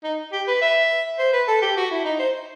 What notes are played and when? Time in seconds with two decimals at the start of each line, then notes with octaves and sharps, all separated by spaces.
0.04 D#4
0.32 G4
0.47 B4
0.62 E5
1.19 C5
1.33 B4
1.48 A4
1.62 G4
1.77 F#4
1.91 E4
2.05 D#4
2.19 C5